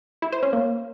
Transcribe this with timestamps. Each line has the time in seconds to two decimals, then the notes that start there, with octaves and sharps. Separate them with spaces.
0.22 E4
0.32 C5
0.43 C#4
0.53 A#3